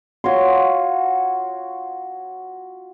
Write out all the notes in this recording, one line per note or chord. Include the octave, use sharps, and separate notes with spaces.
F4 F#4 C#5 C6